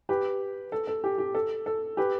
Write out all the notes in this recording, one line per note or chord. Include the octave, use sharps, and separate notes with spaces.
G4 B4
A4
A4
G4
G4
A4
A4
G4 B4